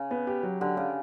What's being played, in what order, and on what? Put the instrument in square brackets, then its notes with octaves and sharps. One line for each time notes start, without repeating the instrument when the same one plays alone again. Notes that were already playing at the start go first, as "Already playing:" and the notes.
Already playing: [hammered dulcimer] C#3
[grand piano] B3
G4
F#3
[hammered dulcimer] D3 [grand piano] G4
[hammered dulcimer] C#3 [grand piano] G4